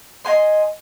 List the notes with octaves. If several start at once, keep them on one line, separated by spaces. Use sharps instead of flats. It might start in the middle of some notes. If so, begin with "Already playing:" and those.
D#5 F5 G#5 C6